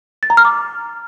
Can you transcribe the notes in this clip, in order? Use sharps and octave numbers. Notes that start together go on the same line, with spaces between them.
A6
A#5
F6
D6